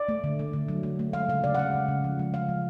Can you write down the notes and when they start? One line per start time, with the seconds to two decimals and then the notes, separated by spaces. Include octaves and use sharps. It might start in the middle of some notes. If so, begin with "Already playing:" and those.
Already playing: D5
0.09 A3
0.24 D3
0.39 A3
0.53 D3
0.69 F#3
0.83 A3
0.99 A3
1.13 G#3 F5
1.29 C#3 F5
1.44 C#3 D5
1.55 F#5
1.58 G#3 F5
1.75 C#3
1.88 C#3
2.04 F3
2.19 G#3
2.34 F3 F5
2.49 F3